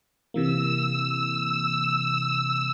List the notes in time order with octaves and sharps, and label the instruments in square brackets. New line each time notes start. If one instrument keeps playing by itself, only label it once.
[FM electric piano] C3 E3 A#3 [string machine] E6
[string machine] E6